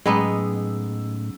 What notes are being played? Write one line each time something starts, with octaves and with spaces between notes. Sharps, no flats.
A2 F#3 G#3 B3 C#4 D#4 E6